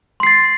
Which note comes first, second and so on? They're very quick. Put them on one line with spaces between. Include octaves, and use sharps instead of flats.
C6 C7 A6